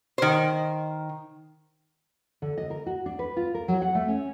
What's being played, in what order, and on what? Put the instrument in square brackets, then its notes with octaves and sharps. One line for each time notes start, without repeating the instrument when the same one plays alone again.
[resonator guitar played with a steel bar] D#3 C5
[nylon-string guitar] D3
D#5
A#4
F#4
D4
B4
F4
A#4
F#3
F#5
A3
C#4